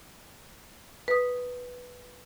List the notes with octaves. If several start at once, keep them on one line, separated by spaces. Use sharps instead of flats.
B4 D#6